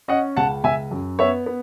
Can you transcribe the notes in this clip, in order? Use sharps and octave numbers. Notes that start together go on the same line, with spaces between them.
C#4 D#5 F#5
C#2 F#5 A5
C#2 E5 G#5
F#2
B3 C#5 E5
B3